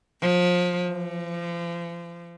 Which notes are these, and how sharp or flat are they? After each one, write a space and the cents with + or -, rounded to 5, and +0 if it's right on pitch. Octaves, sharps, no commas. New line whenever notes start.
F3 +30
F3 -35